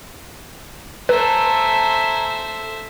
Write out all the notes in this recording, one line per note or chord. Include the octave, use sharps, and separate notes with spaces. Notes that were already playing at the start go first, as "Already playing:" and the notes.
A3 B4 C5 E5 G#5 A#5 E6